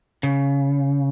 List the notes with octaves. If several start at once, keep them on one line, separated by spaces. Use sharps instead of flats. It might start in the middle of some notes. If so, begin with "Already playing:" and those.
C#3